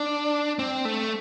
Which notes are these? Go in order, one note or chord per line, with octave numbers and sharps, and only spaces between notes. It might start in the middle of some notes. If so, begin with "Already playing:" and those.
Already playing: D4
C4
A3